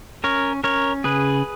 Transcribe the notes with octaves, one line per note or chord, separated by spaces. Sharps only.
C#4 A#4 C#5
C#4 A#4 C#5
C#3 G#4 B4